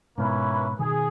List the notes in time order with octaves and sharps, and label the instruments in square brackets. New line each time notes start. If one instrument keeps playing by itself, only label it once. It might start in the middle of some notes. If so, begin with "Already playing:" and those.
[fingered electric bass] G#2 B2 [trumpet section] A#3 C#4 E4 B4
[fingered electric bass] B2 D#3 [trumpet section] G#4